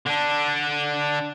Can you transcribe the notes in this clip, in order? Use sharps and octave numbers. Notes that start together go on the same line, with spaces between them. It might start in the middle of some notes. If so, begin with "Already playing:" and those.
D3 D4